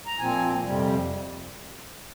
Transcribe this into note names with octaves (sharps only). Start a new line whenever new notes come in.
A#5
A#2 F3 C4 G#5
F2 C3 G3